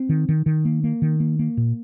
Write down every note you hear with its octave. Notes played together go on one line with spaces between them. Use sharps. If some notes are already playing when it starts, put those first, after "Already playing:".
Already playing: C4
D#3
D#3
D#3
A#3
A#3
D#3
A#3
A#3
A#2